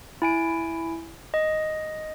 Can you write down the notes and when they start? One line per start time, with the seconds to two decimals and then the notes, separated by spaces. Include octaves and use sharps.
0.22 E4 G#5 D7
1.34 D#5